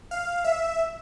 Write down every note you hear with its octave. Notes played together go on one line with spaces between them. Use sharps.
F5
E5